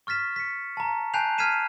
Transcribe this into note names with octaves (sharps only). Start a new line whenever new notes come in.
C#6 F6 A6 B6 E7
B6 C#7
A5 A#5
G#5 A5 F#6 G6 C7 F7
F6 G#6 B6 C7 D#7 E7